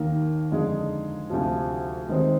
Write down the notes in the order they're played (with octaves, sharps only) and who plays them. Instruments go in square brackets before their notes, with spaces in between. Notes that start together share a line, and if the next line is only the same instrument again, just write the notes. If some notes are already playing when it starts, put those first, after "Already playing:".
Already playing: [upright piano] D#2 D#3 A#3
F2 D3 G#3 D#4 G#4
D2 C3 F3
D#3 G#3 C4 D#4